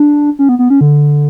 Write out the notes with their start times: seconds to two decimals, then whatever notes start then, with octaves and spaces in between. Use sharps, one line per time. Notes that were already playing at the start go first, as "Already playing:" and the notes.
Already playing: D4
0.39 C#4
0.49 B3
0.59 B3
0.70 C#4
0.81 D3